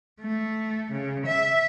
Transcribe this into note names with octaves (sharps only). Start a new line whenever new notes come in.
A3
C#3
E5